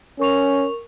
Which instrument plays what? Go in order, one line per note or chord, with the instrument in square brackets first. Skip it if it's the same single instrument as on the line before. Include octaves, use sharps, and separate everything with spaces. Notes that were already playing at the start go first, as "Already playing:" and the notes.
[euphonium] C#4 [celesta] A#4 C#6 F7